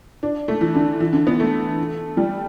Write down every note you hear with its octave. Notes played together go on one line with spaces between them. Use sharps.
D4
A3
E3
D3
E3
D3
B3
A3
G3